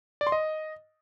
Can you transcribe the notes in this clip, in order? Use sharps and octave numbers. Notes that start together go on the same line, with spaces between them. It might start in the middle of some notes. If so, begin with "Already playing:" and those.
D5
C6
D#5